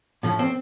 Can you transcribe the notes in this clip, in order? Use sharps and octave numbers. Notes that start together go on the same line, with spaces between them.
A2 F3 A3
C4